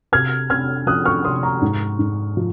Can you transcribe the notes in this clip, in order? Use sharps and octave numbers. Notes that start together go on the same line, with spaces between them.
C3 F6 G#6
C3 F6 G#6
F3 D#6 F#6
C#6 F6
C3 C6 D#6
A#5 C#6
G#2
G#2
F3